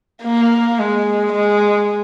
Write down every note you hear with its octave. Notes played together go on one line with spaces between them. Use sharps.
A#3
G#3
G#3